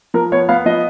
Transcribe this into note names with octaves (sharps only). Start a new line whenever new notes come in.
F3 A#4
B3 C#5
B3 F5
F3 D#5